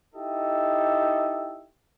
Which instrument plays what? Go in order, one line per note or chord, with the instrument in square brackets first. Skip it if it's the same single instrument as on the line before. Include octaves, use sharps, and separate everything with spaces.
[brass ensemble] D#4 E4 G4 A4 D#5